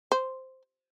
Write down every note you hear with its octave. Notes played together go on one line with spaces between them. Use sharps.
C5